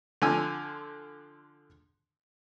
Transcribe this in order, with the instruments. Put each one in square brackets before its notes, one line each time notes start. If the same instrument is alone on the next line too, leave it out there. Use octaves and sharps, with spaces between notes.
[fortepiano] D3 F3 G#5 E6